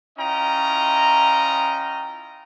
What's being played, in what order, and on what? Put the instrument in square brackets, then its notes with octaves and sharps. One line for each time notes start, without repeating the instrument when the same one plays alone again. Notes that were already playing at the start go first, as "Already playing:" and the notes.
[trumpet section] C#4 E4 F4 D#5 G5 A#5